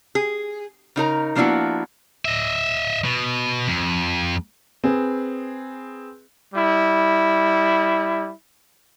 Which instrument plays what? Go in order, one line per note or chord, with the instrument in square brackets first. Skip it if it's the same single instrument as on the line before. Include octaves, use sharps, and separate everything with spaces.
[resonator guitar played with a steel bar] G#4
C#3 D#4 A#4 A#5
F3 A#3 B3 D4 E4 F#4
[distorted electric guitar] D#5 E5
B2
F2
[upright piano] C4 G#4 B4
[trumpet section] G3 E4